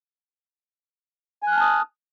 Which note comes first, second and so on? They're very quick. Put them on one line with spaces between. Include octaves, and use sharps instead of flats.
G#5 F#6 F6 A5 D#6